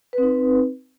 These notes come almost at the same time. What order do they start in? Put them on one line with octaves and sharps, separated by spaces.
B4 C4 D#4